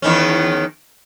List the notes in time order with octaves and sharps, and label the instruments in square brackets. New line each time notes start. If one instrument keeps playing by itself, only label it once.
[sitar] E2 D#3 C#4